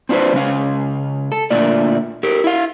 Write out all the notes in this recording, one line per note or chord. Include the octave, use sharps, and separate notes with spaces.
C4 D4 F4 F#4 B4 C5
C#3 G#3 C#4 F5
A4
A#2 D3 A3 A#3 F4 D5
G4 A4 A#4
E4 F5